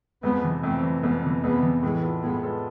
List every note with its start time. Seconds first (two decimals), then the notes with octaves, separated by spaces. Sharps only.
0.23 F2 G#3 B3
0.43 C3 E3
0.63 F2 A3 C4
0.83 C3 E3
1.02 F2 G#3 B3
1.23 C3 E3
1.43 F2 G#3 B3
1.63 C3 E3
1.83 A2 E3 G#3
2.03 G#3 B3 F4 A4
2.23 A2 G#3 B3
2.43 G#3 B3 F4 A4